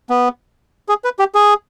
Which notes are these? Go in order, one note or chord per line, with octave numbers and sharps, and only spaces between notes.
B3
G#4
B4
G4
G#4